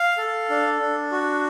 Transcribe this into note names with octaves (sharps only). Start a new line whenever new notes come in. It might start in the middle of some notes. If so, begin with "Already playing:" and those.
Already playing: F5
A4
D4
D4
F#4